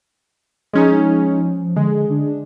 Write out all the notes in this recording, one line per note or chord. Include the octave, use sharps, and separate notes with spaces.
F3 G#3 C#4 D#4
D3 G#3
D4